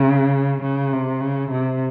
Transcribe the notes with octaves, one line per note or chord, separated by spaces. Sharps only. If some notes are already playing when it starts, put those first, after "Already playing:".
Already playing: C#3
C#3
C3
C#3
C3